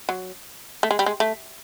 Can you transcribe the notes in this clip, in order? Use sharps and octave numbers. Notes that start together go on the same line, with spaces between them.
F#3
A3
G#3
G3
G#3
A3